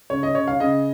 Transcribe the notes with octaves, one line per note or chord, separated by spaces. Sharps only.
C#3 C#5
D#5
C#3 C#5
F5
C#3 D#5